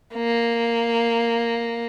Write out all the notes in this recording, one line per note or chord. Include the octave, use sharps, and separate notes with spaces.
A#3